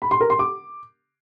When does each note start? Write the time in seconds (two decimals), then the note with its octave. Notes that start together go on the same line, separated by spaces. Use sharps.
0.02 B5
0.11 C6
0.21 A#4
0.30 C6
0.39 D6